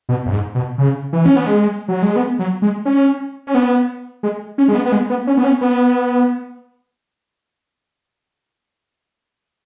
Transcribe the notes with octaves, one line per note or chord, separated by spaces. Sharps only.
B2
F#2
G#2
B2
C#3
E3
C#4
B3
G#3
F#3
G#3
B3
F#3
G#3
C#4
C#4
B3
G#3
C#4
G#3
B3
B3
G#3
B3
C#4
B3
C#4
B3